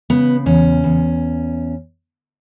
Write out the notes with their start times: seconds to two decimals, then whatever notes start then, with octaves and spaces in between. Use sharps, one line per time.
0.10 C#3 B3
0.46 E2 C#4
0.84 E2